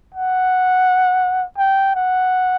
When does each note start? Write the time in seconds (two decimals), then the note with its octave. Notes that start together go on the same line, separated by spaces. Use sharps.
0.14 F#5
1.58 G5
1.95 F#5